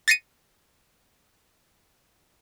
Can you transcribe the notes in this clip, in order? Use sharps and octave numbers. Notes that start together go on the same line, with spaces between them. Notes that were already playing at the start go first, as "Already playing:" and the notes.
A6 A#6 C7 C#7 D#7